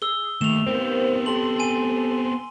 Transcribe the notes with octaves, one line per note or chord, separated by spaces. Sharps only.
G#4 E6 G7
D#2 A3 E7 F7
D#2 B3 C4 C5
G4 A4 C6 F#7
G#5 D#7